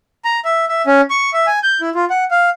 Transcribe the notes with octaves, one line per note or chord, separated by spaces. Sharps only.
A#5
E5
E5
C#4
C#6
E5
G#5
G6
E4
F4
F#5
F5